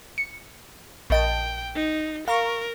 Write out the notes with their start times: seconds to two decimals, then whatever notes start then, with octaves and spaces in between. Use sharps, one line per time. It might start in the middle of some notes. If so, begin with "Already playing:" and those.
0.18 C#7
1.10 A#1 D#5 G5 A5
1.75 D#4
2.28 A#4 F5 A#5 C#6